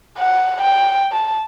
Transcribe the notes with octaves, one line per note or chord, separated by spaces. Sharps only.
F#5
G5
A5